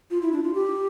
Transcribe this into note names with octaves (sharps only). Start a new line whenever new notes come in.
F4
E4
D4
F4
G4